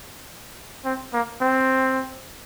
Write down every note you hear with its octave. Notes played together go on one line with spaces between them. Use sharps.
C4
A#3
C4